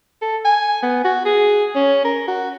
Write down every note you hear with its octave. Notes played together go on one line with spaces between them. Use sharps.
A4
G#5
B3
F#4
G#4
C#4
A#4
F#4